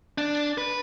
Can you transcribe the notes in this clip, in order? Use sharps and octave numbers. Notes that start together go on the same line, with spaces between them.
D4
B4